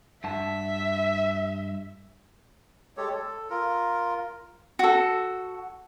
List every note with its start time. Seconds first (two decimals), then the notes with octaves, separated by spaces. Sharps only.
0.24 G2 E5 F#5 A5
2.97 G#3 G4 A4 C#5
3.13 A4
3.50 F4 A#4
4.79 F#4 A4